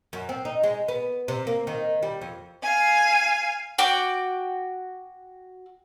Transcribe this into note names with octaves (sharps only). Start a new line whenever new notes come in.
F#2
C4
D#4
G#3
B3
C3
A#3
D#3
G3
F2
F5 G#5
F#4 G5 D6